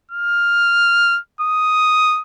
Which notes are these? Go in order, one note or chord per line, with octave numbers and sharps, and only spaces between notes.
F6
D#6